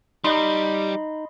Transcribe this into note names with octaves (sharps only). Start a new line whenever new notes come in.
G3 D#4 D#5 B5 C6